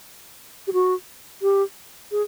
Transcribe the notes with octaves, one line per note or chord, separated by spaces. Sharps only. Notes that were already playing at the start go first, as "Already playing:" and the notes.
G4
F#4
G4
G#4